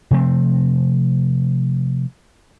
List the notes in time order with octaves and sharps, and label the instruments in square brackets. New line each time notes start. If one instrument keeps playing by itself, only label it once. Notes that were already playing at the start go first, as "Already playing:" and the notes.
[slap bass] C3 F3 A3 C4